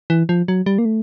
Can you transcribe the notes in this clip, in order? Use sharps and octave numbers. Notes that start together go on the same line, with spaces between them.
E3
F3
F#3
G3
A#3
A3